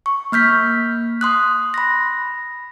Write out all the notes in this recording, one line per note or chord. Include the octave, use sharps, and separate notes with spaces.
C#6
A#3 F6 G6 B6
C6 D#6 F#6
B5 A#6